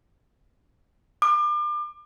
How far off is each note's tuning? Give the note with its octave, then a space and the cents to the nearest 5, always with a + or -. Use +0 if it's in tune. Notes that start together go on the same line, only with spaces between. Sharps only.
D6 +35